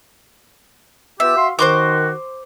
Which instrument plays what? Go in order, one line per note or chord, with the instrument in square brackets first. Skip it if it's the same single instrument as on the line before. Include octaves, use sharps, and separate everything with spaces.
[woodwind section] B3 F4 G4 [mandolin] E5
[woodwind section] F#4 F5 C6
[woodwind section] D#3 F#4 [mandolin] C5 C6 D6